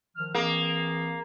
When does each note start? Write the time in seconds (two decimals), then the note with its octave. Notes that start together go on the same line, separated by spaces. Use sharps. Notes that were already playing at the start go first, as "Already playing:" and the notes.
0.16 D#3 F3 F6
0.35 E3 A#3 C4 G#4